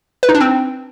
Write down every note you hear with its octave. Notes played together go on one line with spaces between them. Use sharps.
B4
D#4
D4
C4